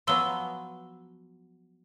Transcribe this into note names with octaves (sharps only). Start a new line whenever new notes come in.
F3 F#3 B3 C6 E6 G7